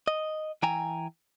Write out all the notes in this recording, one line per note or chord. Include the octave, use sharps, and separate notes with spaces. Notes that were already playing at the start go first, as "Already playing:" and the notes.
D#5
E3 G5 G#5 A#5